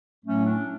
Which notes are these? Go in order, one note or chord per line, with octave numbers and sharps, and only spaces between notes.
A2 F#3 A3 C#4
D4